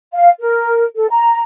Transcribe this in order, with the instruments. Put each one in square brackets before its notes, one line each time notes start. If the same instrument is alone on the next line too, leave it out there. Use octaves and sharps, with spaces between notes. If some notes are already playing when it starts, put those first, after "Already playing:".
[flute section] F5
A#4
A4
A#5